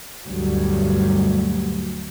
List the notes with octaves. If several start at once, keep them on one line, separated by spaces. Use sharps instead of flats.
D2 G2 F#3 G3